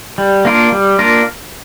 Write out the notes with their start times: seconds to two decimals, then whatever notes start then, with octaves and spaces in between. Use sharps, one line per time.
0.18 G3
0.45 A#3 D4 F4 A#4
0.72 G3
0.99 A#3 D4 F4 A#4